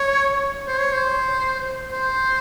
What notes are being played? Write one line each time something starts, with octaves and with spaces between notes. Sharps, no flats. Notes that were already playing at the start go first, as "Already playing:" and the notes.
Already playing: C#5
C5
C#5
C5
C5